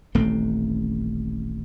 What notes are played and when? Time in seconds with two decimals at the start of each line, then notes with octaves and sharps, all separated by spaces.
0.15 D#1 A1 A3 C4